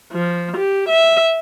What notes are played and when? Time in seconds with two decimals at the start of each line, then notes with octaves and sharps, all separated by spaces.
0.12 F3
0.57 G4
0.88 E5